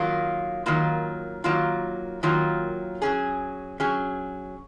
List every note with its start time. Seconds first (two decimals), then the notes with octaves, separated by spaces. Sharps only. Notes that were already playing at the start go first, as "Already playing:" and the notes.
Already playing: D#3 F#3 A#3 F4
0.66 D#3 F#3 A#3 F4
1.44 D#3 F#3 A#3 F4
2.23 D#3 F#3 A#3 F4
3.02 F#3 C#4 G#4
3.80 F#3 C#4 G#4